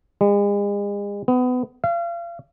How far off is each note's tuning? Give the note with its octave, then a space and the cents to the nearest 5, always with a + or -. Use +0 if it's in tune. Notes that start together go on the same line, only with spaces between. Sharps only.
G#3 -40
B3 +25
F5 -35